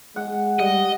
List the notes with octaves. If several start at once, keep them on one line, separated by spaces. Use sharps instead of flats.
G#3 F#5
G3 D#5